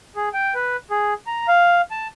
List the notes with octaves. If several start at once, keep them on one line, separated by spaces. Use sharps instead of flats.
G#4
G5
B4
G#4
A#5
F5
A5